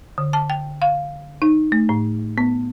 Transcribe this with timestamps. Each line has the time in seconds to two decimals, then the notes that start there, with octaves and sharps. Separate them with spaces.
0.18 D3
0.33 A5
0.50 G5
0.82 F5
1.42 D#4
1.72 A3
1.89 A2
2.38 B3